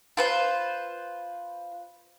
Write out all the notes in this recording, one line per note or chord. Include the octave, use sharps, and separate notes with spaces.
F4 B4 C5